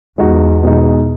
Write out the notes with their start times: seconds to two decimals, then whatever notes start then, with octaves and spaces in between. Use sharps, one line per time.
0.18 E2 G#3 D#4 F#4
0.63 B2 G#3 D#4